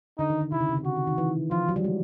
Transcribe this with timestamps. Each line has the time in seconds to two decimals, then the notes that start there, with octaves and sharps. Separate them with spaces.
0.19 D3 D#4
0.30 D#3
0.41 D3
0.52 C3 E4
0.60 C#3
0.69 C3
0.77 C#3
0.85 D3 F#4
0.96 D#3
1.07 D#3
1.18 E3
1.51 F3 F4
1.68 F#3
1.76 G3
1.84 G#3